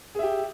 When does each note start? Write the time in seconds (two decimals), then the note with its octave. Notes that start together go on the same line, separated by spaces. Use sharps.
0.15 G#4
0.19 E5
0.23 G4